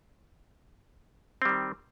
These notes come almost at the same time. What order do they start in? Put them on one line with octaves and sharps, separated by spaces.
C4 G3 D#3